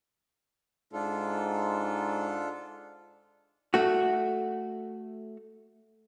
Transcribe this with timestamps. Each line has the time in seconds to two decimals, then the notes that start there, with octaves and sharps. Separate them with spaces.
0.93 G#2 D4 F4 A4
3.74 A3 F#4